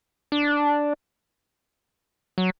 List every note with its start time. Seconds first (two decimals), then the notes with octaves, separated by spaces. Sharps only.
0.32 D4
2.38 F#3